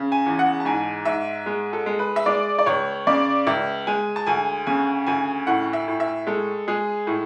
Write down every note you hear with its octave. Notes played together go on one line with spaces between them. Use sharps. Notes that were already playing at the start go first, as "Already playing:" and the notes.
Already playing: C#3
G#5
E2
F#5
A5
G#2 G#5
G#2 E5
G#3
A4
G#3
B4
E5
G#3 D5
D5
C#2 C#5
C#3 D5
C#2 E5
G#3 G#5
A5
D2 G#5
C#3 G#5
D2 G#5
A2 F#5
E5
A2
E5
G#3 A4
G#3 G#4
A2